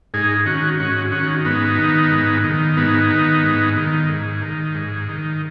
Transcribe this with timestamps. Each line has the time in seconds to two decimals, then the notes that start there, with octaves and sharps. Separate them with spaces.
0.14 G#2 D#4 G#4
0.46 D#3 C#4 F#4
0.79 G#2 C#4 F#4
1.12 D#3 C#4 F#4
1.45 G#2 B3 D#4
1.78 D#3
2.11 G#2
2.44 D#3
2.77 G#2 B3 D#4
3.10 D#3
3.44 G#2
3.77 D#3
4.09 G#2
4.42 D#3
4.75 G#2
5.09 D#3